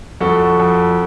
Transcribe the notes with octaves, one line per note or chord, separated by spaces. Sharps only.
F2 F#4 A4
F2